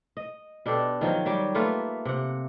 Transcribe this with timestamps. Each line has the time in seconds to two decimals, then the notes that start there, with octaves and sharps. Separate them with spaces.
0.17 D#5
0.66 B2 D4 G4 A4
1.01 D#3 F3 F#3
1.26 F#3 G3 G4
1.55 A3 A#3 F4 B4
2.05 C3 F#5